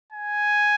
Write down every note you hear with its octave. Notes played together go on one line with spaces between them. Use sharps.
G#5